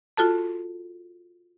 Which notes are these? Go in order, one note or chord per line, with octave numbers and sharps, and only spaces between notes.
F4 F#4 A4 A5